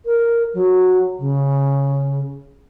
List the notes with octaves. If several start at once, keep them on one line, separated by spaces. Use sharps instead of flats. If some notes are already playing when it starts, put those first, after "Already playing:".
A#4
F#3
C#3